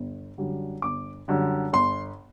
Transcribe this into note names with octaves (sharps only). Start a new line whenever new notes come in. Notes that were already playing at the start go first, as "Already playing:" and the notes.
Already playing: G1
F#2 D3 G3
G1 D6
F#2 D3 G3
G1 C6